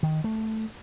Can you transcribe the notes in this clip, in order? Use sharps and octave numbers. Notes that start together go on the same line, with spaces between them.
D#3
A3